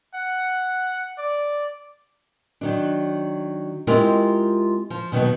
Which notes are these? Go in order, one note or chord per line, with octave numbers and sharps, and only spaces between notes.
F#5
D5
D#3 F#3 D4
G#3 C4 E4 F4 G4 A#4
F3
B2 D#3 F3 F#3 B3